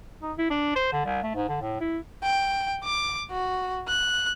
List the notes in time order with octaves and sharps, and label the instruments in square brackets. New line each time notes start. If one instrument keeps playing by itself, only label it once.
[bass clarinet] D#4
E4
D4
C5
D3
C2
A3
G#2
D3
A2
E4
[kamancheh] G5
D6
F#4
F#6